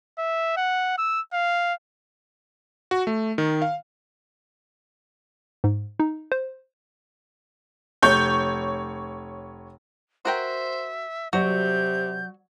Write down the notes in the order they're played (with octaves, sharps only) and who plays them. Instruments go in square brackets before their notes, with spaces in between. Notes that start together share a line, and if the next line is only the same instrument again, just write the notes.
[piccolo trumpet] E5
F#5
E6
F5
[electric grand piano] F#4
A3
D#3
F5
[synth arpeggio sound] G#2
D#4
C5
[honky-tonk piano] F1 C#5 G6
[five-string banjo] F#4 A#4 G5 [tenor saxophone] C5 [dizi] E5
[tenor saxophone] C3 [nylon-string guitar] F#3 D5 [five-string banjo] F#4 [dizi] G6